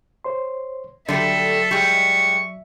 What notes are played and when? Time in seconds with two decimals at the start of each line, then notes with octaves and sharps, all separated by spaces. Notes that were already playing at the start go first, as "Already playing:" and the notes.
0.25 C5 C#5 C6
1.08 D3 F#3 G3 A4 D5 E5
1.71 G3 G#3 C#6